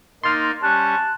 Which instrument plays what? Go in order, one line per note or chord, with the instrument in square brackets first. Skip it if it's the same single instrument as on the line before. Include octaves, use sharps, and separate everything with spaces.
[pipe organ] A#3 D#4 [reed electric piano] C6 F6 [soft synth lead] A6
[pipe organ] G3 C#4 [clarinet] A5 [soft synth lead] F#6